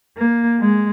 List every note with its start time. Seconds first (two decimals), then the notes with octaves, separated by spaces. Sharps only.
0.17 A#3
0.60 G#3